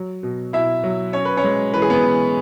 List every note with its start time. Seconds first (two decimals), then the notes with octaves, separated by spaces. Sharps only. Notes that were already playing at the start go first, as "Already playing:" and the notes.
Already playing: F#3
0.23 B2
0.53 B2 E4 E5
0.84 F#3
1.13 C#4 C#5
1.25 B4
1.37 C#4 C#5
1.44 G#3
1.74 E3 B4
1.82 G#4
1.90 B3 B4
2.04 E3